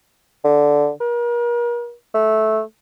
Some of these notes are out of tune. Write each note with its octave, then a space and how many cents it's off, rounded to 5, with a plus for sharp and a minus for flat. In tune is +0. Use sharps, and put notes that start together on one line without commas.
D3 -5
A#4 +40
A3 -10